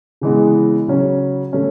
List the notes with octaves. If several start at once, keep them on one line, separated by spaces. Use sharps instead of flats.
C#3 E3 G#3 B3
C#3 F#3 C#4
A3 C#4